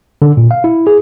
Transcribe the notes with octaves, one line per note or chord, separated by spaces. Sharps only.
D3
A#2
F5
E4
G#4